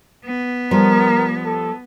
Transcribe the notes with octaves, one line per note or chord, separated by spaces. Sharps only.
B3
F3 G3 A#4
A4